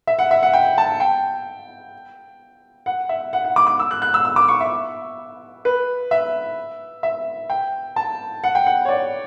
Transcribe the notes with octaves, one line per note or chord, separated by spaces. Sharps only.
E5
F#5
E5
F#5
G5
A5
G5
F#5
E5
F#5
F#5
D6
D6
E6
F#6
F#6
E6
E6
D6
C#6
E5
B4
E5
E5
G5
A5
F#5
G5
F#5
C#5
D5